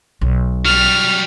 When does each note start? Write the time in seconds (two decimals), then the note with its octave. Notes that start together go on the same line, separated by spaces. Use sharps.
0.21 B1
0.65 F#3 G3 F6